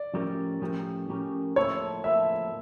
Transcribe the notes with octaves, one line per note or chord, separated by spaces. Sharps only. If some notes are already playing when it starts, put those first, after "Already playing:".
Already playing: D5
A2 F3 C#4 G4 A#4
A2 F3 C#4 G4 A#4
A2 F3 C#4 G4 A#4
A2 F3 A#3 E4 A4 C#5
A2 F3 A#3 E4 A4 E5